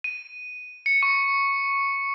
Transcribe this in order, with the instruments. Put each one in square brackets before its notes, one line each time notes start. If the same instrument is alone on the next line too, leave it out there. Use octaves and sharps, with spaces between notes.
[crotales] D#7
C#7
C#6